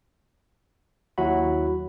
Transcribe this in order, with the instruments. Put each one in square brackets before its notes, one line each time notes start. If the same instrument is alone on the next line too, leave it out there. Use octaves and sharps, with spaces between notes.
[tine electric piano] D#2 F#3 E4 F#4 F#5 B5